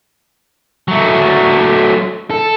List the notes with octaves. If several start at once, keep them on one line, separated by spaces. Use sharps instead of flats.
F#3 A3
A4